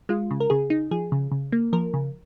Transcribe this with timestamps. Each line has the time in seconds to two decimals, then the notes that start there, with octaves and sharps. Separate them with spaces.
0.09 G#3 F4
0.31 C#3
0.40 A#4
0.50 C#3 G#4
0.70 D#4
0.91 F3 G#4
1.12 C#3
1.32 C#3
1.52 A#3
1.73 F3 A#4
1.94 C#3